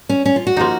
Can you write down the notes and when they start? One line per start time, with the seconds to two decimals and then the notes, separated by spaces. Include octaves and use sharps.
0.09 C#4
0.26 C#4
0.36 F4
0.47 F#4
0.57 F3 A#3 D#4